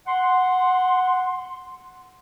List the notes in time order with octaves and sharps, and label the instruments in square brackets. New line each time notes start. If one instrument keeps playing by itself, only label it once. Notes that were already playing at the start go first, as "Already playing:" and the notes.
[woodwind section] F#5 C6